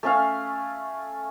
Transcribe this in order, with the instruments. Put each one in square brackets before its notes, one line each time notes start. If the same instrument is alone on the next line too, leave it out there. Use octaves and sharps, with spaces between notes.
[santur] A3 C#4 F5